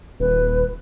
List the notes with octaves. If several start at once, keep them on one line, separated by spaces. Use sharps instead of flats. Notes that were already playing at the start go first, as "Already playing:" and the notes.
D#1 B4